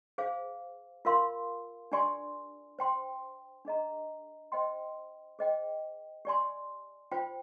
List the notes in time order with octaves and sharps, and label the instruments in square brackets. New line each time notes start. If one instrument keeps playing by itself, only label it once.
[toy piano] G#4 C5 F5
F4 A#4 F5 C6
D4 G4 D5 G#5 C6
C5 G5 C6
D4 G#4 D#5 A#5
C5 D#5 G5 C6
G#4 C5 D#5 G5
G4 D5 G#5 C6
F4 C5 G5